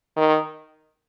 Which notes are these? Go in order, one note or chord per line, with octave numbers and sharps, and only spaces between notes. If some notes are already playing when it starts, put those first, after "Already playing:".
D#3